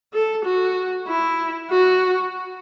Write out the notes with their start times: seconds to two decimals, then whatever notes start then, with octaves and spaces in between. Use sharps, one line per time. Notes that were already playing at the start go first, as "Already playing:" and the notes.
0.13 A4
0.44 F#4
1.08 E4
1.71 F#4